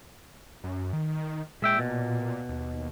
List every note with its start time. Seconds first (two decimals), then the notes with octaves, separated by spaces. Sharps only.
0.64 F#2
0.93 D#3
1.62 A#2 G#3 E5 G5
1.79 B2
2.49 D#2